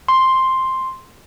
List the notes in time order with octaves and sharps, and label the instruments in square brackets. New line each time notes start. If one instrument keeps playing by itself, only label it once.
[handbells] C6